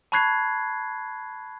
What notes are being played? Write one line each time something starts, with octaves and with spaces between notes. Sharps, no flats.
A5 B5 C#6 F#6 G#6 C7